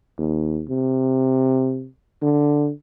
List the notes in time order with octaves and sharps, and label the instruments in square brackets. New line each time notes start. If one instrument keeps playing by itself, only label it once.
[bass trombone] D#2
C3
D3